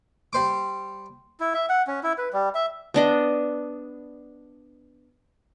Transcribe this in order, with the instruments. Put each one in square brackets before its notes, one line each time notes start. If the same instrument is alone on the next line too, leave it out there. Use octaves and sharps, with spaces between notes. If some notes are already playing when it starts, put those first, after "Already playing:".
[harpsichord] G3 C5 D6
[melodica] E4
E5
F#5
C#4
E4
B4
G3
E5
[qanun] B3 D4 D#5